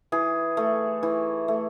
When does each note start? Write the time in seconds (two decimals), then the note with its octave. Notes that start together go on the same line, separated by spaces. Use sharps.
0.12 E3 G#4
0.57 A3
1.03 E3
1.48 A3